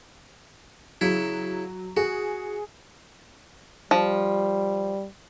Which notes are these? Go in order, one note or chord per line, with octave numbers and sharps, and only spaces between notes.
C#3 F#3 E4
F#4 G#4
F3 G3